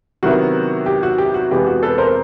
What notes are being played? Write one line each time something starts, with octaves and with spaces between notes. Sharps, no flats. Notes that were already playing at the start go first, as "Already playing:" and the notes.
C3 D#3 F#3 B3 E4 F#4
G4
F#4
G4
F#4
F2 C3 E3 G#3 B3 G4
F#4
A4 B4
A#4 C5